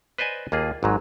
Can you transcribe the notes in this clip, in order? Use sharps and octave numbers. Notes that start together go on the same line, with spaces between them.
B4 C5 D5 D#5 G#5
D#2 A#3 F4 G#4
G#1 G#2 F#3